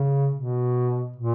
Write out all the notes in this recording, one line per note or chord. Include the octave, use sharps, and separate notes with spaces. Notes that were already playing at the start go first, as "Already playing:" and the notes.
Already playing: C#3
B2
A#2